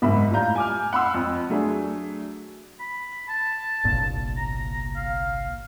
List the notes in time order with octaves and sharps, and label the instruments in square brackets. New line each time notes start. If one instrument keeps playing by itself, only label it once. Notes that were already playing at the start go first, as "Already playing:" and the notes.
[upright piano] F#1 G#2 E5 B5
A2 G3 F4 A#5 G6
G#5 D6 F6
F#5 B5 C6 E6
F2
F#3 A3 D4 G#4
[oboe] B5
A5
[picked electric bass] G1 C2 A#2
[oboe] A#5
F5